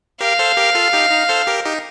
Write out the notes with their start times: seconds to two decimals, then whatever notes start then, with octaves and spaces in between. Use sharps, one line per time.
0.21 G4 A#4 F5
0.39 A4 C5
0.57 G4 A#4
0.75 F4 A4
0.93 D#4 G4
1.11 D#4
1.29 A4 C5
1.47 G4 A#4
1.65 D#4 G4